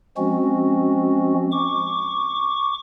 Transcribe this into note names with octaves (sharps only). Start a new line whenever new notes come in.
F3 G#3 C4 C#4 F#4
C#6 D6